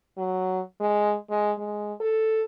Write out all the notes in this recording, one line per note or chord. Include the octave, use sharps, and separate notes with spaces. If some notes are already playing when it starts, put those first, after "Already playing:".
F#3
G#3
G#3
G#3
A4